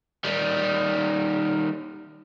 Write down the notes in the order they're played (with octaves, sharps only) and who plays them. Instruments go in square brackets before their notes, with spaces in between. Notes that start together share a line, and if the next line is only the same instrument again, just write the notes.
[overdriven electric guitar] D#3 G3